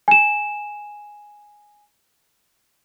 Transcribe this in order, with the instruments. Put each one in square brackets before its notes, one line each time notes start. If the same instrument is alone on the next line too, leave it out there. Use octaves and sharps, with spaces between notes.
[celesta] G#5 E7